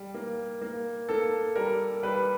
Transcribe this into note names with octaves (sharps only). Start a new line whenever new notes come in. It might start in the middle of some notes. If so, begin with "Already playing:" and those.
Already playing: G3
A#3
A#3
A#3 A4
G3 A#4
G3 B4